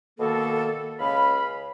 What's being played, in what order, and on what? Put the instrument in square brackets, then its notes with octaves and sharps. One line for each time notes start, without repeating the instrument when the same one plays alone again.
[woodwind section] B2 D#3 A#3 A4
C#2 F5 B5